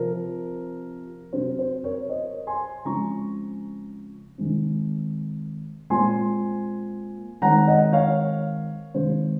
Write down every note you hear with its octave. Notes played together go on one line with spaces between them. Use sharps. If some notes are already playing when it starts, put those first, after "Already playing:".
Already playing: C3 F3 C4 A#4
C3 F#3 C4 C5
C5
A#4 C#5
C5 D#5
G#5 C6
C#3 F3 G#3 C4 A#5 C#6
C3 D#3 G#3 C4
A#2 G#3 C4 G#5 C6
D#3 G#3 C4 F#5 A#5
D#5 F#5
C#5 F5
C3 D#3 G#3 C5